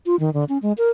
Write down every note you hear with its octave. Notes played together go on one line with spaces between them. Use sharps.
F4
D#3
D3
C#4
G#3
A#4